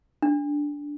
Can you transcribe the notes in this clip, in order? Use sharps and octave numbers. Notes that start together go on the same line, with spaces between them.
D4